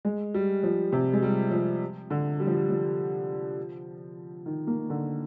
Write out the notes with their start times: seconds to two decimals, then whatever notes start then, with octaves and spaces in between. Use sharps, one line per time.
0.05 G#3
0.34 G3
0.63 F3
0.93 C3
1.13 G#3
1.23 G3
1.51 F3
2.10 D3
2.40 G3
2.47 F3
2.54 G3
2.70 F3
4.46 D#3
4.67 A#3
4.90 D3